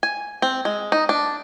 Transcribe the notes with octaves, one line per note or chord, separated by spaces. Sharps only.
G#5
C4
G#3
D#4
D4